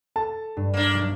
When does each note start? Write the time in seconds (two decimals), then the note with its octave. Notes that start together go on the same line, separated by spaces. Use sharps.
0.16 A4 A5
0.57 G2
0.74 A#3 D4
0.93 B1